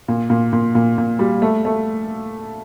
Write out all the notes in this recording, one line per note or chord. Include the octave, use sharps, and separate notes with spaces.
A#2
A#2
A#2
A#2
A#2
G3
A3
A3